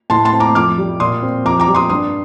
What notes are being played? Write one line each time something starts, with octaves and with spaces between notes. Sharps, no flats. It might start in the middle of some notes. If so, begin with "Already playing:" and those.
A2 A5 C6
A5 C6
C4
A#5 D6
F2 D6 F6
G3
A#2 C6 D#6
C4
F2 A#5 D6
A#5 D6
G3
C6 D#6
G2 C6 D#6